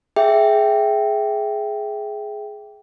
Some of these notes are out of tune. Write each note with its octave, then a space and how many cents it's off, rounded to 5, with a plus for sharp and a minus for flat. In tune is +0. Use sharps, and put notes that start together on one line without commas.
G#4 +15 E5 +0 G5 -5